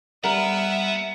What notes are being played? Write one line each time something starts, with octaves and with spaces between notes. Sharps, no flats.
G3 B3 A#4 B4 E5 F#5